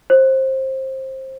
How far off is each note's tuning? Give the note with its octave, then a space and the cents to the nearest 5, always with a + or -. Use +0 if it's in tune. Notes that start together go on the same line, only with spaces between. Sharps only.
C5 +20